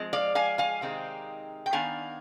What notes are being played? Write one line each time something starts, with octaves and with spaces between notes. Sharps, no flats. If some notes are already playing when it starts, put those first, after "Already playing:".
Already playing: F3 G#3 C4
D5 F5
F5 G#5
F5 G#5
C3 D#3 G#3 C4 D#4
G5
D#3 B3 D4 F5 G#5